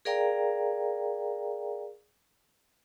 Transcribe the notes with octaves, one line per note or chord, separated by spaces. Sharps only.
G#4 A#4 D5 F5 G5 A#5